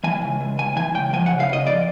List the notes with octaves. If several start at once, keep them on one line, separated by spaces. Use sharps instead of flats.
E3 G#5
C#2
C#2
C#2 G#5
E3 G#5
C#2 G5
F3 G#5
F#5
C#3
F5
C#3 D#5
F2 D5